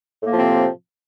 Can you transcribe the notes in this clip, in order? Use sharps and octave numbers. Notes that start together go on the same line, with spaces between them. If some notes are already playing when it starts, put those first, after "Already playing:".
A2 C3 F3 A#3 C4